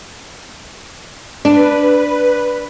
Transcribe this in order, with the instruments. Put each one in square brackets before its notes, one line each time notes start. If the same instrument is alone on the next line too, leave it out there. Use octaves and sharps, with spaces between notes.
[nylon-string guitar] D4 [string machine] B4